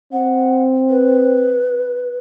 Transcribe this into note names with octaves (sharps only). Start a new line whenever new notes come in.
C4 F#5
B4